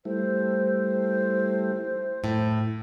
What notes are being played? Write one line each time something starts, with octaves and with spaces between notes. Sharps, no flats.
G3 A3 E4 C5
A2